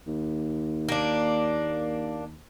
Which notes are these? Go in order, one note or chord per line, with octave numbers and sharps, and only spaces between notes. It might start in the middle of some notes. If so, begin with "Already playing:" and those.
D#2
A#3 D4